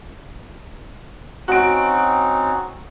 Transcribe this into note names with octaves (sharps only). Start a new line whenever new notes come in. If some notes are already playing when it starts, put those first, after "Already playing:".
C4 C#4 D#4 F#4 D7